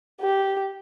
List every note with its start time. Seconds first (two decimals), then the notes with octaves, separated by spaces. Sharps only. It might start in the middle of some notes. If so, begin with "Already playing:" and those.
0.21 G4